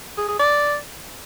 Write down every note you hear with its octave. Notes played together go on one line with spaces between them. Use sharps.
G#4
G#4
D5